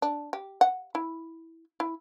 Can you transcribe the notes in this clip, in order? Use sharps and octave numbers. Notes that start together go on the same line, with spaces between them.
D4
G4
F#5
E4
E4